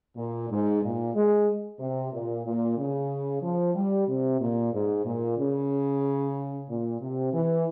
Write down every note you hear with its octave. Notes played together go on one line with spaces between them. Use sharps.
A#2
G#2
A#2
G#3
C3
A#2
A#2
C#3
F3
G3
C3
A#2
G#2
A#2
C#3
A#2
C3
E3